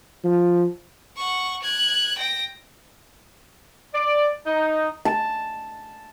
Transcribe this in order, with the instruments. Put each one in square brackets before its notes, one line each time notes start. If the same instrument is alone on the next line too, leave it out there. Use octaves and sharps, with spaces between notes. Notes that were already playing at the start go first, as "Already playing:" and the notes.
[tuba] F3
[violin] F#5 C#6
F#6 G#6
G5 A#6
[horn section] D5
D#4
[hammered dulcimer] A5